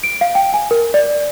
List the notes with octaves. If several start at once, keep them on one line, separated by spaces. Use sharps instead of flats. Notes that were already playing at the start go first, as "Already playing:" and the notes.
D7
F5
G5
G#5
A#4
D5